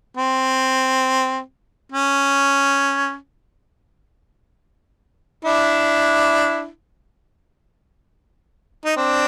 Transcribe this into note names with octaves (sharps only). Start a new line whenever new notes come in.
C4
C#4
D4 E4
D#4
C4 D4